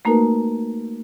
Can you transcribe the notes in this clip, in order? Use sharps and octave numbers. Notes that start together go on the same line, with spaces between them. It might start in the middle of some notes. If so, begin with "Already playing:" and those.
A3 A#3 D#4 F#4 A#4 B4